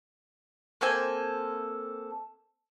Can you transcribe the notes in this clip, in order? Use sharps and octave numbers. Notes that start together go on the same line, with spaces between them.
A#3 C4 A4 G#5